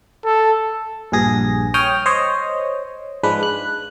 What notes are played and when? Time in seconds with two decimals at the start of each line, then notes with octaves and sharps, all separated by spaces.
0.25 A4
1.12 A#1 G2 G#4 A#6
1.74 C#5 G5 D#6 F6
2.06 C5 C#5 D#5
3.23 G#2 F3 G#3 D4 B4
3.43 F#6